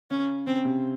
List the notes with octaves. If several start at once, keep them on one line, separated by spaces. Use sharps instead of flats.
C#3 C#4
C#3 C4
C3